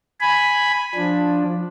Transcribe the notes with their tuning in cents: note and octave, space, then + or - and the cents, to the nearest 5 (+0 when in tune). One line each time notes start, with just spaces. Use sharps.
G#5 +0 B5 +0
F3 +10 D4 +0